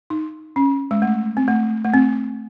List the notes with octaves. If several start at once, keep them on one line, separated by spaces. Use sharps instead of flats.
D#4
C#4
G#3
A3
C4
A3
A3
C4